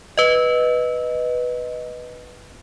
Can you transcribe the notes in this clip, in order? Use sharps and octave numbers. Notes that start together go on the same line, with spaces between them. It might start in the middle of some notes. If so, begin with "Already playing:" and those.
B4 D#5